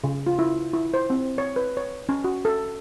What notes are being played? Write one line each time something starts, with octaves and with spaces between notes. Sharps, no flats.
C#3
F4
E4
E4
C5
C4
C#5
B4
C#5
C#4
F#4
A4